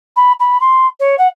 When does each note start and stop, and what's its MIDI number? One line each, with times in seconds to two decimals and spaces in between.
0.16 0.32 83
0.40 0.60 83
0.61 0.86 84
1.00 1.15 73
1.18 1.27 78